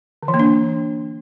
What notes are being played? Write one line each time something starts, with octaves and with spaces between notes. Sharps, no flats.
D3
E3
A#3
D4